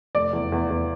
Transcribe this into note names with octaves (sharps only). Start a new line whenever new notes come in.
F1 D5
E2
E2
E2